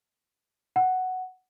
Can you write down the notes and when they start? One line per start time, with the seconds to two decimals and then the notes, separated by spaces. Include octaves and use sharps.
0.76 F#5